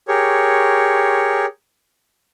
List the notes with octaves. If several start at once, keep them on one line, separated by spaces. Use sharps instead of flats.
G4 G#4 A#4 C#5 C#6